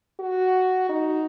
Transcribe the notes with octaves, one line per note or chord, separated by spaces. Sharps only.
F#4
D#4